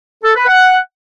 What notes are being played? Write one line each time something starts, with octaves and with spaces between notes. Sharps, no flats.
A4
B4
F#5